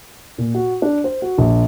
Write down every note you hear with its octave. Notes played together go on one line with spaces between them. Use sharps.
A#2
F#4
D4
C5
F#4
A#1